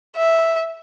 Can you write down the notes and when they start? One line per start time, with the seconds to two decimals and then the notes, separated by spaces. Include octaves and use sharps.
0.16 E5